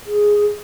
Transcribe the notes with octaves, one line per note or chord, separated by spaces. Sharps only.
G#4